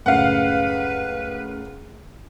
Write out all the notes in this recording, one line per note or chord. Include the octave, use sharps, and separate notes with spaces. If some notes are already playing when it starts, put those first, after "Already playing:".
C#2 F#2 A2 B4 F5 F#5